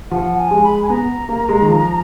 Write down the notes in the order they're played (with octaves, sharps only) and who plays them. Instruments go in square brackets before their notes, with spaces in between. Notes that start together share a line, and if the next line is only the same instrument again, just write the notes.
[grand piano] F3 [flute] F#5
[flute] G#5
[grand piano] G#3
[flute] B5
G#5
[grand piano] B3 [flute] A#5
[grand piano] A#3
G#3
D#3
F3